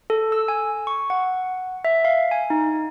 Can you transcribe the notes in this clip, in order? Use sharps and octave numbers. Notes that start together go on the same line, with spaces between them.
A4
E6
G#5
C#6
F#5
E5
F5
G#5
D#4